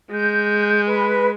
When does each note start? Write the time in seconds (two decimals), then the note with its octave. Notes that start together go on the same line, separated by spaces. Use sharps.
0.12 G#3 G6
0.87 B4